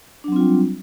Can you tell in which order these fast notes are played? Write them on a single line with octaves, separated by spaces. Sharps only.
D4 F#3 C4 F4 G3